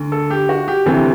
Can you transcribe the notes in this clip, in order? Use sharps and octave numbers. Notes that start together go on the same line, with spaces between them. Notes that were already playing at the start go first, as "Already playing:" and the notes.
Already playing: D2 D3
A4
G4
F#4
G4
D2 C3 E3 G4